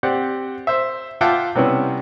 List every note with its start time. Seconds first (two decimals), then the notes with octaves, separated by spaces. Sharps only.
0.03 C4 G4 D5 F#5
0.67 C5 E5
1.21 F4 E5 F#5 G5 A5 D6
1.55 C3 G3 B3 C#4 E4